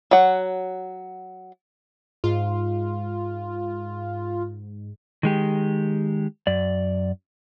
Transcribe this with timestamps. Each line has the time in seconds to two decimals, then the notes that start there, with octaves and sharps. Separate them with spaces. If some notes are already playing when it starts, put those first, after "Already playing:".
0.11 F#3 F#5
2.24 G#2 F4
5.23 D#3 G#3 G4
6.47 F#2 D5